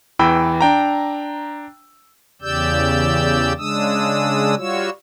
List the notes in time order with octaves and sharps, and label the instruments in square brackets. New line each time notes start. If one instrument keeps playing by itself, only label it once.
[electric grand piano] E2 E3 G5 B5 E6
D4 G5 A#5
[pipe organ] E2 C#3 G4 D5 E6 G6
C#3 G#3 D4 D#6 E6
G3 F4 F#4 C#5 E6